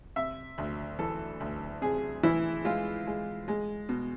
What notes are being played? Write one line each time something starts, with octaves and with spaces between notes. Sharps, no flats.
C3 E5
D2
E3 A4
D2
C3 G#4
E3 E4
G#3 F4
G#3
G#3
B2